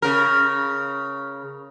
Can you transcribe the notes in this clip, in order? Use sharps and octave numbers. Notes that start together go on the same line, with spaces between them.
C#3 A#4